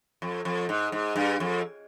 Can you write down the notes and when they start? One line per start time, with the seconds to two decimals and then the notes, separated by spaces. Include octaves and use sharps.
0.22 F2
0.45 F2
0.69 G#2
0.92 G#2
1.16 G2
1.40 F2